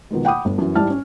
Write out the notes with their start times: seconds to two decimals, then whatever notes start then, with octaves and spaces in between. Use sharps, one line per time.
0.10 B2 D#3 F3 G#3
0.25 F#5 G5 B5 D6 D#6
0.45 G1
0.58 F#2 E3
0.75 G#2 G3 E4 A5 F6
0.90 C#4